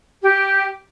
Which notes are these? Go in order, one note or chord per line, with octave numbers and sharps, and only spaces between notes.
G4